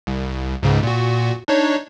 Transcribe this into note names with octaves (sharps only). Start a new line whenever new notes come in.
C2
C#2 G#2 C#3
A#2 F#4
D4 D#4 C#5